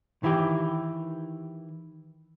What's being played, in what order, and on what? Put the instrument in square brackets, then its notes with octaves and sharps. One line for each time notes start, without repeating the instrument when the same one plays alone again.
[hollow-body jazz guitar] D#3 E3 E4 G4